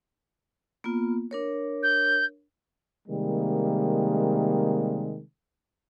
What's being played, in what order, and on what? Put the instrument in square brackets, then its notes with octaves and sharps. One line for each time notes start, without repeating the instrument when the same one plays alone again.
[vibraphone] A#3 B3 F4
D4 A#4 C#5
[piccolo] G6
[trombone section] C3 D#3 G3 G#3 A#3